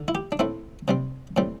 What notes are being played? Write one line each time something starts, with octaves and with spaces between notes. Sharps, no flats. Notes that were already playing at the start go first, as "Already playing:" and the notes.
Already playing: D3
E4
G4
D4
A2 A3 C4 E4
C3 G3 C4
A2 G3 C4